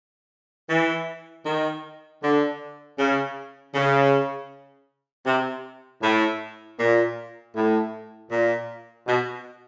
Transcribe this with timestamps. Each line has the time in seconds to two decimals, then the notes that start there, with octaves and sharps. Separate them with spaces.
0.70 E3
1.46 D#3
2.23 D3
2.99 C#3
3.75 C#3
5.26 C3
6.03 A2
6.80 A#2
7.56 A2
8.32 A#2
9.07 B2